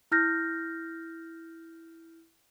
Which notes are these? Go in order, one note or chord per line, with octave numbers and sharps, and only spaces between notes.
E4 F6 G6 A#6